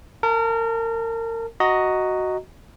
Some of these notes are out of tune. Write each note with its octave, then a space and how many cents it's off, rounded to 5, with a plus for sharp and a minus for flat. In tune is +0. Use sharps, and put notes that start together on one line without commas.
A#4 -30 A5 +0
F#4 +5 D#5 +5 A#5 -10